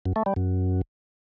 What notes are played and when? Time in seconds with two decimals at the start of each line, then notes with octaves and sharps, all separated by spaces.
0.05 F#2
0.16 A3
0.26 G3
0.36 F#2